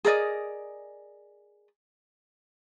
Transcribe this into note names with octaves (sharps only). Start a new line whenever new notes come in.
G#4 A#4 D5 D#5